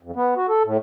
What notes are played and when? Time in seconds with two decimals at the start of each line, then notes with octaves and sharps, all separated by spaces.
0.03 F2
0.16 B3
0.37 F#4
0.48 A4
0.65 A2